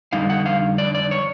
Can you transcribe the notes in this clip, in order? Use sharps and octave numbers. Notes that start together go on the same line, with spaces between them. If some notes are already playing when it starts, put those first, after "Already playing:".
F2 D3 G3 D#4 F5
F#5
F5
D5
D5
C#5